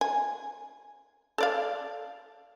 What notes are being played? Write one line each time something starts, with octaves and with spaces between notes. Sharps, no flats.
G#5
A4 D5 F5